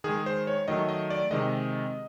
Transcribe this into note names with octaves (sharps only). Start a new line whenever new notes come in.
D#3 G#3 G#4
C5
C#5
D#3 F#3 A3 D#5
D#5
D5
C3 D#3 G#3 D#5